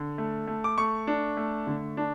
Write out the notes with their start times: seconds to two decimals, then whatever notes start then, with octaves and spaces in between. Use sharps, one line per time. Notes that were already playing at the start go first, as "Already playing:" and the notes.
Already playing: D3
0.18 A3
0.47 A3
0.64 D6
0.78 A3 C#6
1.07 D4
1.37 A3
1.67 D3
1.97 D4